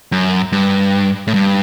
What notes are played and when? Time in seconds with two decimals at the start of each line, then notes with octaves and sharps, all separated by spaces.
0.12 F#2
0.52 G2
1.27 A2
1.34 G2